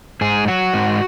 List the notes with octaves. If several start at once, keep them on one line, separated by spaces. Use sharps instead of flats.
G#2 G#4
F#3 F#4
G#2